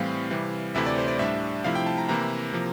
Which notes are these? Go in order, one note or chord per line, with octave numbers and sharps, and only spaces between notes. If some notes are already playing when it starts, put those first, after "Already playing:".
Already playing: A2 E3 G3 C4 F5
C3 E3 G3
D2 C3 E3 A3 E4 E5
D5
C5
D5
A2 G3 D4 E5
C3 F3 A3 E4 F5
G5
A5
A#5
C3 E3 A#3 E4 A#5
C3 F3 A#3